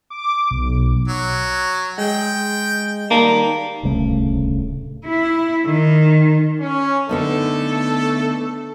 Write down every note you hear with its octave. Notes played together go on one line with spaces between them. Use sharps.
D6
B1
F#3
G#3 G5
D#3 G3 A#3 A5
D1 C2 C#3 A3
E4
D#3
C#4
D3 A3 B3 D#4 A4